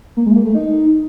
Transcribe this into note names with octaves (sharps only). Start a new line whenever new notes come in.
A#3
G#3
A#3
A3
D#4